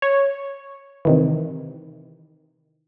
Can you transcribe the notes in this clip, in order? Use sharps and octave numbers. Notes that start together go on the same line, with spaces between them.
C#5
C3 D#3 E3